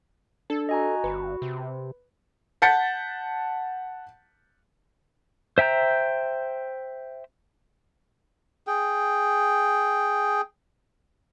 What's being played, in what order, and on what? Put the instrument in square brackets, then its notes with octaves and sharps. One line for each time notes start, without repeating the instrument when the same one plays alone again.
[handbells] D4 [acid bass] A4
[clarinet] F#4 [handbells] D#5 G#5 A#5
[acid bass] G1 [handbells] B4
[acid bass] C3
[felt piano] F#5 A5 G6 A6 B6 C#7
[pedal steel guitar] C5 E5 G5 A#5 G6
[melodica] G#4 G5